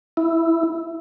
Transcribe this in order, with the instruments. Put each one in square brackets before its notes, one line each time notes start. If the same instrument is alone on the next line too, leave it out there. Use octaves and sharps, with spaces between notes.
[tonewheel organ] E4